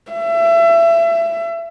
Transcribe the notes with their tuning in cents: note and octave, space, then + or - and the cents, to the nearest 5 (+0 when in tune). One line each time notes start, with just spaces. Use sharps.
E5 +30